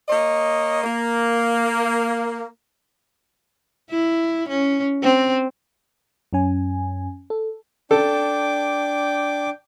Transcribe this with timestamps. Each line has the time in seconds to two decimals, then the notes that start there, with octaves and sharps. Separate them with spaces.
0.09 A#3 C#5 D#5
0.83 A#3
3.90 E4
4.48 C#4
5.02 C4
6.33 F#2 C#4 G#5
7.30 A4
7.91 D4 A4 G5 D6